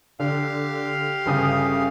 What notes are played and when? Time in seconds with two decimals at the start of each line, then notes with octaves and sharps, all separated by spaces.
0.20 D3 G4 F5
1.26 G1 C#3 D#6